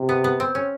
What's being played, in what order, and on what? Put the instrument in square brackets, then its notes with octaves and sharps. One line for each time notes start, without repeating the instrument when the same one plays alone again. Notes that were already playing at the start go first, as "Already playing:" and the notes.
Already playing: [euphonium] C3
[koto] B3
B3
C4
C#4